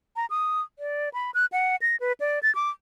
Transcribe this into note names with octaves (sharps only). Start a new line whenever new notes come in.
A#5
D#6
D5
B5
F#6
F#5
A#6
B4
D5
A6
D6